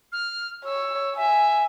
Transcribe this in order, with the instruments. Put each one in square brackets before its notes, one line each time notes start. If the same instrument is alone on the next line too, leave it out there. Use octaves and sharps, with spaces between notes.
[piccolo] F6
[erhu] C#5 [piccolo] E6
[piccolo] E5 [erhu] G#5